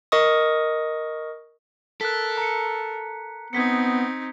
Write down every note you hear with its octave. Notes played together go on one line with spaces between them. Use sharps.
A#4 D#5 C#6 D#6
A4 A#4 F#6 B6
A#5 C#7
B3 C4 D#4 G#6 B6 C#7